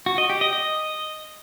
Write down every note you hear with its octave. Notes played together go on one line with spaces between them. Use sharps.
F#4
D#5
G4
D#5
D#5